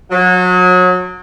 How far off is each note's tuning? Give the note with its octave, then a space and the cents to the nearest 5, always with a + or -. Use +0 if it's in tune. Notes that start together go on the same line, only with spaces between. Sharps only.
F#3 -30